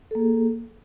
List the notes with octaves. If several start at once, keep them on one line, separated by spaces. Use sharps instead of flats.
A#3 G#4 A4